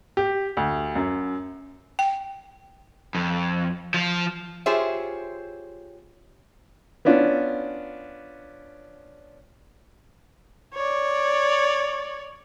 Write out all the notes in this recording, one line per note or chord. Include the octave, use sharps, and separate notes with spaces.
G4
D2
F#2
G5
F2
F3
F4 G4 G#4 C5 C#5 E5
B3 C#4 D4 F4
C#5 D5